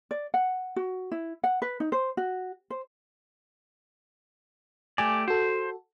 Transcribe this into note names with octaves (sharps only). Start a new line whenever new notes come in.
D5
F#5
F#4
E4
F#5
B4
D#4
C5
F#4
C5
A3 G4 D5 G#5
F#4 A4 C5